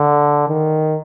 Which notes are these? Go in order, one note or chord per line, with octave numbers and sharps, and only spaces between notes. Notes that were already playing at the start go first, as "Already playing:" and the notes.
Already playing: D3
D#3